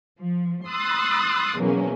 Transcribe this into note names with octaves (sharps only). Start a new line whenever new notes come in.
F3
C6 D#6 E6 F#6 A6
E2 B2 F#3 A#3 C#4